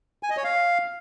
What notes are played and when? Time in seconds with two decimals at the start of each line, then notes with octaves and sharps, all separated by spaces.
0.23 G#5
0.30 D#5
0.37 C#5
0.44 F5